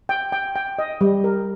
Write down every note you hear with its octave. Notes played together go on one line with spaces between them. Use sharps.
G5
G5
G5
D#5
G3
A#4